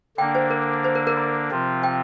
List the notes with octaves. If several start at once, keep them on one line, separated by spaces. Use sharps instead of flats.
D3 A#3 D4 G5
C5
A#4
C5
A#4
A#4
A#5
C3 F3 C4 F4
G5